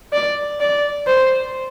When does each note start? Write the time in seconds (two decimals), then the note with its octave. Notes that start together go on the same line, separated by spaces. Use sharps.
0.13 D5
0.60 D5
1.07 C5